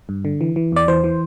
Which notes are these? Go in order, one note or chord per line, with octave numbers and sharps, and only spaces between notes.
G2
D3
E3
E3
E2 D5
E3 C5
E3